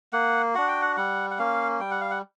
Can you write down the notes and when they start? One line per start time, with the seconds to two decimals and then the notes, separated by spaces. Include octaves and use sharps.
0.13 A#3 F#5
0.55 D4 F#4 F#5
0.68 G5
0.82 F#5
0.97 G3 F#5
1.31 F#5
1.39 A#3 C#4 F5
1.80 G3 G5
1.91 F#5
2.01 F5
2.11 F#5